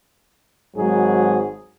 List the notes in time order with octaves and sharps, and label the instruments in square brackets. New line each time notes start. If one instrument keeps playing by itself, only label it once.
[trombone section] G#1 G#2 F#3 G#4